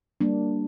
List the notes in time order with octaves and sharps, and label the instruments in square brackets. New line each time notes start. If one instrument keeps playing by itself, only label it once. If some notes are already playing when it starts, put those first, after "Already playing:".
[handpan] G3 A#3 D4